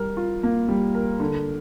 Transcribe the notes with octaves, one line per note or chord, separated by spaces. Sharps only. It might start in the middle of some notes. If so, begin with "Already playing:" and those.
Already playing: G3 A#4
F4
A#3
G3
A#4
D3